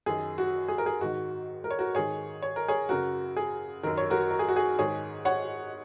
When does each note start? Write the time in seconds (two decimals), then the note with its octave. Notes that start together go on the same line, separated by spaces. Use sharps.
0.06 F#2 D#3 G#4
0.38 F#4
0.68 G#4
0.78 A#4
0.86 G#4
1.01 G#2 D#3 F#4
1.64 A#4
1.71 C#5
1.79 F#4 A#4
1.94 G#2 D#3 G#4 C#5
2.42 C#5
2.56 A#4
2.68 G#4 C#5
2.89 F#2 C#3 F#4 A#4
3.37 G#4
3.83 F#2 D#3 A#4
3.98 C#5
4.10 F#4 A#4
4.31 A#4
4.39 G#4
4.49 F#4
4.56 G#4
4.78 G#2 D#3 G#4 C#5
5.25 C#5 F#5